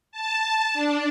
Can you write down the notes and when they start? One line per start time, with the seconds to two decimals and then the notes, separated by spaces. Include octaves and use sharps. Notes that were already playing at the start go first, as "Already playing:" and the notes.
0.12 A5
0.73 D4